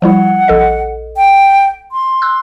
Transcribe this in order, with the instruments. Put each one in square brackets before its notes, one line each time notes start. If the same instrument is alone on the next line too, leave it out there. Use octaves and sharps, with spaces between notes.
[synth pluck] F3 G3 E4 [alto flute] F#5
[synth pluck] A#1 A4 D#5
[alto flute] G5
C6
[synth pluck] E6 F#6